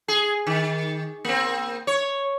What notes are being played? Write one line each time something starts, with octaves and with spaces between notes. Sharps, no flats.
G#4
D#3
A#3 C4
C#5